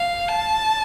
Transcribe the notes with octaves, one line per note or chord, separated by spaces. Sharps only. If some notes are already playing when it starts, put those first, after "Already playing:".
Already playing: F5
A5